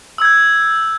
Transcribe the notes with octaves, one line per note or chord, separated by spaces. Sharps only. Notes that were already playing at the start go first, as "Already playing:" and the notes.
E6 G6 G#6